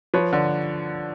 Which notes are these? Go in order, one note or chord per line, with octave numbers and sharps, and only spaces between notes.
F3 B4 C#5
D3